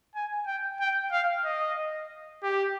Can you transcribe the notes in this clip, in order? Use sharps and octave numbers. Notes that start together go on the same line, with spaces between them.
G#5
G5
G5
F5
D#5
G4